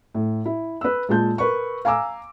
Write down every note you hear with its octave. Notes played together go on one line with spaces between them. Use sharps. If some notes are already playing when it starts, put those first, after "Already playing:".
A2
E4
B4 E6
A#2 G#3 F4 A5 G6
A#4 B4 C#6
F5 G#5 A#5 D6 E6